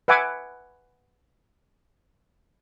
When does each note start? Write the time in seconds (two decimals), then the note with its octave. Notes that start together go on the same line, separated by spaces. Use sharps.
0.08 B4 E5 F#5 G#5 D6